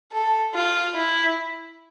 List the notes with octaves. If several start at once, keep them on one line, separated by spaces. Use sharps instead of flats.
A4
F4
E4